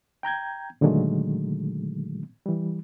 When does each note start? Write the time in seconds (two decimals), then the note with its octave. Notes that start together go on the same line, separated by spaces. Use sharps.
0.23 G5 A#5 G6 G#6
0.81 A#2 D3 D#3 F#3 G#3 A3
2.46 E3 G3